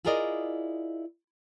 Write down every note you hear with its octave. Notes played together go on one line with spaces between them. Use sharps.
E4 F4 G#4 A#4 D5 D#5